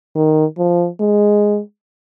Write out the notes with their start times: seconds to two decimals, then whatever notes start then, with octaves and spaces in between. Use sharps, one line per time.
0.16 D#3
0.58 F3
1.00 G#3